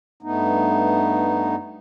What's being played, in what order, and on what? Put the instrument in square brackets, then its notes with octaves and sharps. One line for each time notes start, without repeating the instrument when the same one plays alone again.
[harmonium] G2 A3 B3 D#4